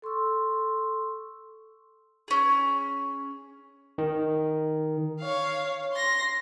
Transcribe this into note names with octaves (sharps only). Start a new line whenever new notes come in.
A4 C6 C#6 E6
C#4 G#4
D#3
C#5 F5
C6 A#6